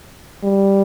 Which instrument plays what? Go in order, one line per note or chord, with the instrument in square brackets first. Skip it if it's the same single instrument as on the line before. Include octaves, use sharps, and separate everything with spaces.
[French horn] G3